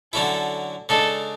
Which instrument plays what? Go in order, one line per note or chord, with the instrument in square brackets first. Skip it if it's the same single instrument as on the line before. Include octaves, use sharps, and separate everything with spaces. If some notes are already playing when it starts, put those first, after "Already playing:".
[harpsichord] D3 F#3 C#4 E4 [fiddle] A4
[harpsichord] C#3 G#3 D4 [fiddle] A4